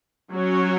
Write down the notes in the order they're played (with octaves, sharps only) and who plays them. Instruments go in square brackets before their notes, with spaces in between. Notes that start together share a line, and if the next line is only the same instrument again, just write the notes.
[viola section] F#3 C#4 F#4 C#5